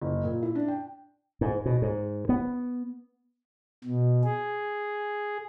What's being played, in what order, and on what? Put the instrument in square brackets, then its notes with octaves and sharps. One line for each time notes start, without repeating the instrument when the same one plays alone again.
[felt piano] F#1
A#2
E4
D4
G5
[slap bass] G#2
B2
G#2
B3
[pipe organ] B2
G#4